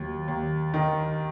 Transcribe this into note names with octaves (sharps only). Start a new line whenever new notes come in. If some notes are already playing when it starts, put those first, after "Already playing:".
Already playing: D#2 F#3
D#2
D#3